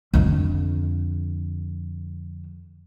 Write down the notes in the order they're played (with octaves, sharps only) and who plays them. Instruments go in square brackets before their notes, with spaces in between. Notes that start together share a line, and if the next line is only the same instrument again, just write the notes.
[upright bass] F2 D3